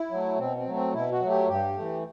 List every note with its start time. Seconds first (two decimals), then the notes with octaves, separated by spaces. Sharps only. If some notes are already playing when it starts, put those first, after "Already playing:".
Already playing: E4
0.11 F#3 A3
0.38 B2 C4
0.57 C4
0.66 F#3 A3
0.75 C4
0.93 B2 E4
1.11 F#4
1.21 F#3 A3
1.30 G4
1.48 G2 G4
1.76 E3 A3